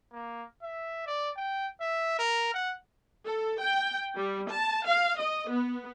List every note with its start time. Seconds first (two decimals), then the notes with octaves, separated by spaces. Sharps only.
0.13 A#3
0.63 E5
1.06 D5
1.37 G5
1.81 E5
2.19 A#4
2.54 F#5
3.25 A4
3.61 G5
4.15 G3
4.49 A5
4.85 F5
5.19 D#5
5.50 B3